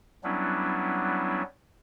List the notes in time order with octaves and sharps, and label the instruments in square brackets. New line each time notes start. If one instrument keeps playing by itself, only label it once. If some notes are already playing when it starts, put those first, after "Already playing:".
[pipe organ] F#3 G3 B3 C#4 D4 E4